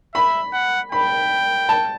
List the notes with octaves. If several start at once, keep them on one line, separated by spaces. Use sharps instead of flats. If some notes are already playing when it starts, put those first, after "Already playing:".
E5 B5
F#5
G5 B5
A5